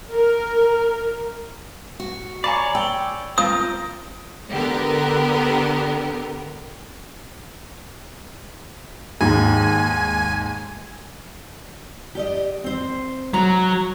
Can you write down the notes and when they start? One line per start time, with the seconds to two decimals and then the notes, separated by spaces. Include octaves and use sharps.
0.13 A#4
2.00 F#4
2.44 C#5 D5 F5 G#5 A#5 B5
2.75 G5 E6
3.38 C4 F4 A#4 D#6
4.50 D3 B3 G4 A#4
9.21 D#2 G#2 G#5
12.15 G4 D5 D#5
12.64 C4 C5
13.34 F#3 A#5